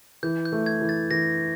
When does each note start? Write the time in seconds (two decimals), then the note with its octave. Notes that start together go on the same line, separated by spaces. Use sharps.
0.23 E3 G6
0.45 G6
0.52 A3
0.66 G#6
0.81 E3
0.89 A6
1.11 E3 A#6